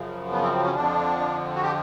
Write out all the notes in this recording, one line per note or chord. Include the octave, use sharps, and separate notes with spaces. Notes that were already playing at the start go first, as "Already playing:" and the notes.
Already playing: F#2 C#3 F3
B3
C4
C4
C#4
F2 D3 F3 D4
F#4
G4